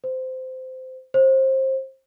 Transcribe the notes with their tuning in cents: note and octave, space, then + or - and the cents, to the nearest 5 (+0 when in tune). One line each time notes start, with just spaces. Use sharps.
C5 -20
C5 +25